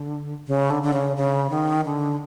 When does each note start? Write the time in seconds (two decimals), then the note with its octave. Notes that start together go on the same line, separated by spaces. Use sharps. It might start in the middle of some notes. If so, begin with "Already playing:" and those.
Already playing: D3
0.47 C#3
0.70 D3
0.83 D3
0.93 C#3
1.17 C#3
1.50 D#3
1.85 D3